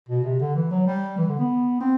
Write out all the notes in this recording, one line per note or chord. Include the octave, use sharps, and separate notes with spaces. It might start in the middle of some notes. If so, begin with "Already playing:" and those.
B2
C3
D3
E3
F#3
G3
E3
D3
B3
C4